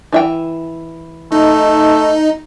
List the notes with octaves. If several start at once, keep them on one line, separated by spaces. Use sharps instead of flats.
E3 E5 G5
A3 D#4